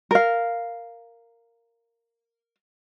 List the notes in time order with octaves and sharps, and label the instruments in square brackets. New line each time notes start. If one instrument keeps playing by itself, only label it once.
[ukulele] A#4 F5